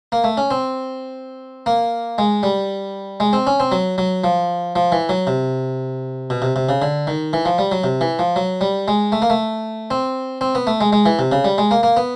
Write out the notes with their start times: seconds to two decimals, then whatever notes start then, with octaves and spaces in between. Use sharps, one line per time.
0.12 A#3
0.24 A3
0.37 C#4
0.51 C4
1.66 A#3
2.18 G#3
2.43 G3
3.20 G#3
3.33 C4
3.47 C#4
3.60 C4
3.72 F#3
3.98 F#3
4.24 F3
4.76 F3
4.92 E3
5.09 F#3
5.27 C3
6.30 B2
6.42 C3
6.56 C3
6.69 C#3
6.82 D3
7.07 D#3
7.33 E3
7.45 F3
7.58 G3
7.72 F#3
7.84 C3
8.01 E3
8.19 F3
8.36 F#3
8.61 G3
8.88 G#3
9.12 A3
9.22 A#3
9.30 A3
9.91 C4
10.41 C4
10.55 B3
10.67 A3
10.81 G#3
10.93 G#3
11.06 E3
11.19 C3
11.32 C#3
11.45 G3
11.58 G#3
11.71 A#3
11.83 A#3
11.97 B3